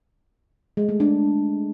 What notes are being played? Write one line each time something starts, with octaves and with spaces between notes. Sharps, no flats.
G#3
A3
D4